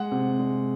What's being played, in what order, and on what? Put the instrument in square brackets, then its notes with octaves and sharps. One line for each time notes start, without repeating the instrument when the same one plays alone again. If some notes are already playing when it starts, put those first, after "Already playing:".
Already playing: [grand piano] G#3 F#5
C3
G#3